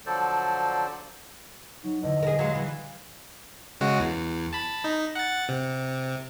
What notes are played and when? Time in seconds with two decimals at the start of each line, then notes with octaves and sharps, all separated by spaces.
0.06 D3 F3 F#3 A4 C5 D5
1.83 F#3 D#4
2.03 E2 D3 D#5
2.23 G#4 A#4
2.39 F#3 G#3 F5 F#6
2.55 E3
3.81 C#3 G#3 F#4
4.00 E2
4.53 A5 B5
4.84 D#4
5.15 F#5 A6
5.49 C3